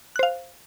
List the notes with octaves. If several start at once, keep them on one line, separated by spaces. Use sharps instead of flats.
C5 F5 F#6